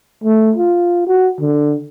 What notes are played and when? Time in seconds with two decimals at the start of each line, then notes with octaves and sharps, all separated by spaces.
0.24 A3
0.56 F4
1.07 F#4
1.40 D3